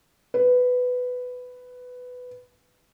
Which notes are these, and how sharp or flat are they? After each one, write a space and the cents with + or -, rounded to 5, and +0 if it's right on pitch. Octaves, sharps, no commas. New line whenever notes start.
B4 +10